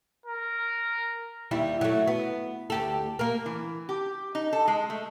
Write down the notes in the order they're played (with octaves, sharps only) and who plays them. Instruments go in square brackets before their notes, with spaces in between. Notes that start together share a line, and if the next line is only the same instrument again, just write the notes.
[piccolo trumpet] A#4
[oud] D#2 G3 E4
F#3 A3
B3
D2 G4 A4
A#3 A#4
[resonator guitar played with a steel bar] E3
G4
D#4
A4
G#3
A3